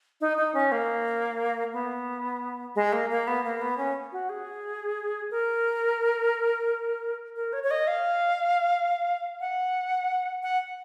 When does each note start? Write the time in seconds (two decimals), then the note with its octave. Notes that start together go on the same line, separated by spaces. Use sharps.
0.21 D#4
0.37 D#4
0.54 C#4
0.72 A#3
1.73 B3
2.75 G#3
2.92 A#3
3.10 A#3
3.27 B3
3.44 A#3
3.61 B3
3.77 C#4
4.12 F#4
4.29 G#4
5.31 A#4
7.36 A#4
7.53 C#5
7.63 C#5
7.71 D#5
7.87 F5
9.40 F#5
10.43 F#5